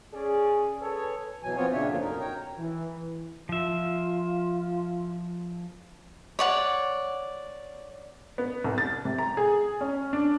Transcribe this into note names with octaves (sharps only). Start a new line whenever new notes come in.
C#4 G#4 D5
G#4 A4 B4 C#5
B2 E3 F#3 G#5
F3 B3 C4 F4 C#5
A#2 C#3 D4 C#5 E5
F#2 D3 F3 A#3 D4 F4
F#2 B2 D#4 A#4
C#5 G5 A#5
E3
F3 F4 E5
C#5 D5 F#5
B3
C2
A6
C3
A#5
G#4
C#4
D4